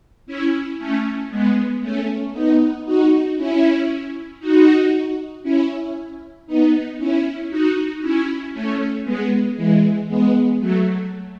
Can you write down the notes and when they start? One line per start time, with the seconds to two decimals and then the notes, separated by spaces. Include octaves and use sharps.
0.26 C#4 E4
0.79 A3 C#4
1.30 G#3 B3
1.81 A3 C#4
2.33 B3 D#4
2.85 D#4 F#4
3.36 C#4 E4
4.40 D#4 F#4
5.43 C#4 E4
6.47 B3 D#4
6.99 C#4 E4
7.50 D#4 F#4
8.02 C#4 E4
8.54 A3 C#4
9.05 G#3 B3
9.57 E3 G#3
10.08 G#3 B3
10.60 F#3 A3